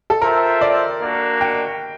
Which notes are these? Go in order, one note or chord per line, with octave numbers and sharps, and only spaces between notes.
A4
F4 A4 A#4 C5 E5 G5
D5
A#3 D4 F#4
G5